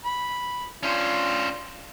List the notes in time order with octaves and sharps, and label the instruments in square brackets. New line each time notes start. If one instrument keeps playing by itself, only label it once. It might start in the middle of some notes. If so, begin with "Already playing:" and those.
[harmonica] B5
[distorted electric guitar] C#4 C5 [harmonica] D4 F4